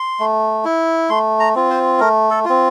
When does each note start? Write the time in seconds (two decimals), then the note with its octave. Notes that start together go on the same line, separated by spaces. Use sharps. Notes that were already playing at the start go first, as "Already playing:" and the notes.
Already playing: C6
0.20 A3
0.65 E4
1.10 A3 C6
1.40 A#5
1.55 C4 F4
1.70 C5
2.00 A3 A#4
2.31 A4
2.45 C4 F4